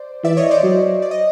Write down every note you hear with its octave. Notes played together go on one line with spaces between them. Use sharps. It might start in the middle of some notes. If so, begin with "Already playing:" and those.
Already playing: C5 D5
E3 D5 E5
C#5 D#5
C5 D5
F#3
D5
D#5